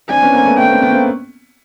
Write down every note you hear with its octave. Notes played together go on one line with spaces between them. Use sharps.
C4 D4 G#5
B3 C#4
A#3 C4
A3 B3
A3 B3 G5
A#3 C4
B3 C#4
A#3 C4